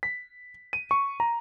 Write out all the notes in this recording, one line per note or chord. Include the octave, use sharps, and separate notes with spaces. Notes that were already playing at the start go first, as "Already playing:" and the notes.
B6
D#7
C#6
A#5